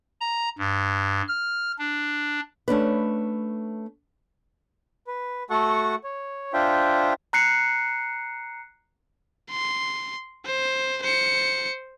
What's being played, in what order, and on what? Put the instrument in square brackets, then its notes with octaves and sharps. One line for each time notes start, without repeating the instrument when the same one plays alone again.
[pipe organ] A#5
G2
F6
D4
[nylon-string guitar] A3 C#4 D4 B4
[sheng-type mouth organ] B4
A3 F#4 A4 F#5 C#6
C#5
D4 F4 C5 E5 G5
[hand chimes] A#5 F#6 C7 C#7
[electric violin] C6
C5
C5 C#7